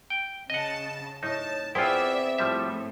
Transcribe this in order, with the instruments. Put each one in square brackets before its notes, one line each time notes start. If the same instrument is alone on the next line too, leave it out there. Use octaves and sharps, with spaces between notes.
[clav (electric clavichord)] G5
[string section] C#3 A5 [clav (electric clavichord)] D#5 F#5
[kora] A2 [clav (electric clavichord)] D#4 [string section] A5
[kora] B3 C4 G#4 [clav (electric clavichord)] E4 F4 [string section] D5 E5
[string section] A2 [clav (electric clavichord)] F3 G3 E5